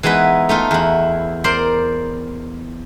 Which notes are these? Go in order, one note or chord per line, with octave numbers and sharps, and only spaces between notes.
E3 G#3 B3 D#4 B4
A3 D#4 F4
E2 E4
A#4 C5 D5 C6